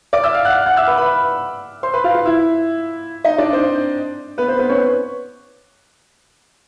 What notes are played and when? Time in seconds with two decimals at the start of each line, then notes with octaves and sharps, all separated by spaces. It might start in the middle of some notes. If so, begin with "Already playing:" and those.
0.13 D5 D6
0.24 E5 E6
0.34 F5 F6
0.45 F#5 F#6
0.66 F#5 F#6
0.77 E5 E6
0.88 B4 B5
0.98 B4 B5
1.83 C5 C6
1.94 B4 B5
2.04 F4 F5
2.15 F4 F5
2.25 E4 E5
3.24 D#4 D#5
3.38 D4 D5
3.53 C4 C5
4.38 B3 B4
4.48 C4 C5
4.59 B3 B4
4.69 C#4 C#5